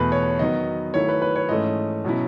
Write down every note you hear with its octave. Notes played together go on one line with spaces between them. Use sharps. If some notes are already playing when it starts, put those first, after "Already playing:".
Already playing: E2 B2 A3 B4
C#5
D#3 F#3 B3 D#5
D#3 F#3 A3 E4 C#5
B4
B4
C#5
G#2 E3 A3 C#4 D#5
B2 F#3 C#4 E4